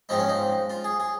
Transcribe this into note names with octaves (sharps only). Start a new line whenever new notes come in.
G#2 F3 G#3 C4 D#4
C#4
D#4
F4
G#4
G#4